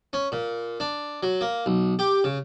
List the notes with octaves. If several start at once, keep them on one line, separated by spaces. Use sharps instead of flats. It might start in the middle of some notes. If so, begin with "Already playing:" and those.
C#4
A#2
D4
F#3
A#3
B1
G4
C#3